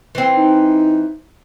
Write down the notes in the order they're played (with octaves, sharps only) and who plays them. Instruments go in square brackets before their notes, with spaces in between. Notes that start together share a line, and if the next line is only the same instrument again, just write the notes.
[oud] E3 C4
[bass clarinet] D#4